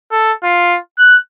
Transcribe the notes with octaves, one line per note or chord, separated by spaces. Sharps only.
A4
F4
F#6